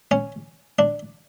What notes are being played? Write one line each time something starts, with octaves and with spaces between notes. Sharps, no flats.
C#4
D4